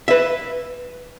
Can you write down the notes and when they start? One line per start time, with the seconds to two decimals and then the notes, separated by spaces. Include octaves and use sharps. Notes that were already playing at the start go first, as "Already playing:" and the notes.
0.08 B4 E5